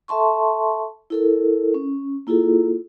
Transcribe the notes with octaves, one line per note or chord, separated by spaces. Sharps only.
A4 E5 A5 C6 C#6
E4 A4 A#4
C#4
A#3 E4 F4 G#4 A4